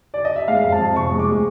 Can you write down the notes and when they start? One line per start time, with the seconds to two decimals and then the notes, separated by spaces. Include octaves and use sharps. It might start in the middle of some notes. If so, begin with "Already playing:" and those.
0.14 D5
0.25 D#5
0.36 E5
0.48 G#3 F5
0.64 F2
0.72 A5
0.79 F2
0.96 C3 C#6
1.11 G#3
1.19 D6
1.27 G#3